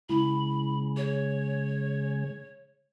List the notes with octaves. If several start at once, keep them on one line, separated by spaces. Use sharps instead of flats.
C#3 G#3 E4 B5
G#4 C#5